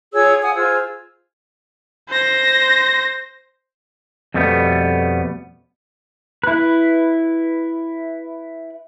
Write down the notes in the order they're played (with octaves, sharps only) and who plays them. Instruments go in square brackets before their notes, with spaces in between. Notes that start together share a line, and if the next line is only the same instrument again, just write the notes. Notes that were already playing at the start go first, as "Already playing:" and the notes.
[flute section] F4 G#4 C#5 E6
F5 F#5 G#5 D#6
F4 G#4 C5 E6
[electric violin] C5 A#6
[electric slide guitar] F2 B2 G3 A3 B3
[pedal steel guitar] E4 B4